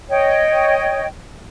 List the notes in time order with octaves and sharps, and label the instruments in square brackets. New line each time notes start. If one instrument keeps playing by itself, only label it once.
[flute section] C#5 D#5 G5